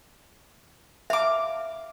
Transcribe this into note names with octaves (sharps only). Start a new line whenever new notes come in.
E5 F5 D6